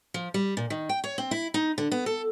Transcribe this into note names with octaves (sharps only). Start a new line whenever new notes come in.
F3
G3
A#2
D#3
G5
C#5
C4
E4
D#4
D3
B3
A4